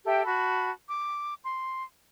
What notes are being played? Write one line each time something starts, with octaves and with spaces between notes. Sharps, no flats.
G4 A4 E5 G5
F#4 A5 B5
D6
C6